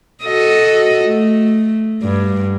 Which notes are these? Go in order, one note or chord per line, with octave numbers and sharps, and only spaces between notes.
F#4 A4 D#5
A3
G2